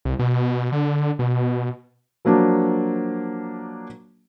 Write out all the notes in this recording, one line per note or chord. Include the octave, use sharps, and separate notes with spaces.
C2
B2
D3
B2
F3 F#3 A#3 D4